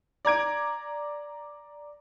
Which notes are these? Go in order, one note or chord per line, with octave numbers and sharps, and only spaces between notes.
D5 A#5 G#6 D7